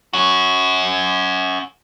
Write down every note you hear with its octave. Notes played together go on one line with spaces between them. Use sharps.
C#4 F#4